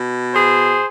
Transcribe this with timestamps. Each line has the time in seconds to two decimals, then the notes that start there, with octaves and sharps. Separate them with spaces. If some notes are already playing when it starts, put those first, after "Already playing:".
Already playing: B2
0.33 G#4 C5